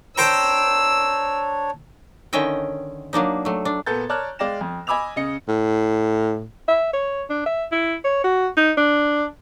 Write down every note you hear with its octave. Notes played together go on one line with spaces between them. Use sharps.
D4 C5 C#5 G5 A#5 E6
D3 D#3 C#4 D#5 E5 G5
F#3 A#3 D4 D#4
F#3 A3
D4
A#2 B3 A4 G6 A6
C#5 D5 A5 A#5 F6 F#6
G#3 D5 F5 G5 A#6 E7
F2
D#5 G#5 B5 D6 E6 F7
C#3 D#5 C#7
A2
E5
C#5
D4
E5
E4
C#5
F#4
D#4
D4